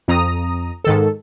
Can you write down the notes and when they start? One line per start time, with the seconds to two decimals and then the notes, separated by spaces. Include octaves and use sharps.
0.08 F2 A#5 D#6
0.84 G#2 D#3 A4